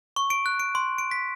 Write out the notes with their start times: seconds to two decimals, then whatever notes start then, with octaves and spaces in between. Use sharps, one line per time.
0.16 C#6
0.30 D7
0.46 F#6
0.59 D7
0.75 C6
0.98 D7
1.11 B6